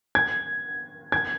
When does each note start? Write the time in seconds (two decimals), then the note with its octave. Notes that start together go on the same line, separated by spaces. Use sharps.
0.15 G#6
1.12 G#6